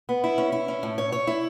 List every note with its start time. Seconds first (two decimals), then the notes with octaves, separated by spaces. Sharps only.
0.09 B3
0.24 E4
0.38 C#4
0.52 E4
0.68 C#4
0.83 A2
0.98 C#5
1.12 C#5
1.27 E4